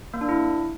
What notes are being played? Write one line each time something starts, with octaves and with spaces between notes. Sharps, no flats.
A#3
D4
E4